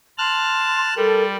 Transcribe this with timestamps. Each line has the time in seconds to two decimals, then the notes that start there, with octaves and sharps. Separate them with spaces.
0.18 A5 C6 F6 F#6
0.97 G3 A4 A#4